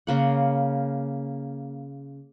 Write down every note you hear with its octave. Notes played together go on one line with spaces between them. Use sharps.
C#3 A#3 F#5